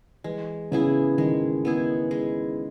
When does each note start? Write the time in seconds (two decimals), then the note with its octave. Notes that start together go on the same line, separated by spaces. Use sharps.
0.24 E3 G#3
0.72 C#3 B3 E4 G#4
1.18 D#3 G#3
1.65 B3 E4 G#4
2.11 G#3